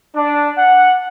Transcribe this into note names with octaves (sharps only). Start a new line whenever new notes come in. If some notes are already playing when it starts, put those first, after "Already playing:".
D4
F#5